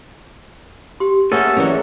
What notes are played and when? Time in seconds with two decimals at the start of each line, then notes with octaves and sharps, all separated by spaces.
1.00 G4 C6
1.32 A3 A#3 C#4 G#4 A4 C#5 F#5
1.57 E3 F#3 C#4 A#4 D5 E5